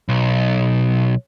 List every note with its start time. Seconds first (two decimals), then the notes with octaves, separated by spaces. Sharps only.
0.09 B1